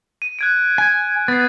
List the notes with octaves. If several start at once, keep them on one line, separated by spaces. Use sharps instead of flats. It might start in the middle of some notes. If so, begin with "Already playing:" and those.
D#7
F#6 G#6 D7
G#5
B3 A6 C7